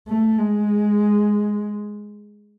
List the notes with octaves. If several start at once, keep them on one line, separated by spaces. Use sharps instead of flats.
A3
G#3